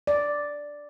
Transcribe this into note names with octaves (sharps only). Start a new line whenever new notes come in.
D5